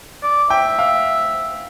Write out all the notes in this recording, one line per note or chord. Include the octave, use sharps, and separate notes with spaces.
D5
E5 G5
F5